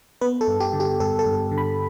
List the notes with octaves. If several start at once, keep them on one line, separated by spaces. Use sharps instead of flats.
B3 B4
A4
G2
G4
D3
G4
G2 A4
A4
G2
D3
B5